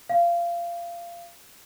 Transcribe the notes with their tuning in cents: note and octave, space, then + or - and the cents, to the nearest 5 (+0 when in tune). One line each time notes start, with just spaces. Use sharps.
F5 -20